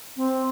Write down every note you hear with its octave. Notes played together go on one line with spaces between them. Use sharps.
C4